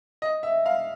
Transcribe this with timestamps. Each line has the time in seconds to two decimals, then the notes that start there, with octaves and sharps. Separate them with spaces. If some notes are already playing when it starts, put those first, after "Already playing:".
0.22 D#5
0.43 E5
0.66 F5